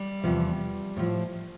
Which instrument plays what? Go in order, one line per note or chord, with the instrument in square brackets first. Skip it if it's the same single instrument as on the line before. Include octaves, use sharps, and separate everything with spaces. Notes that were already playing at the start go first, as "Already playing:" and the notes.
Already playing: [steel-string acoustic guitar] G3
E2 C3 F3
A2 F3